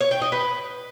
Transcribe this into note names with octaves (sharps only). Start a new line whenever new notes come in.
C#5
G5
D#5
B4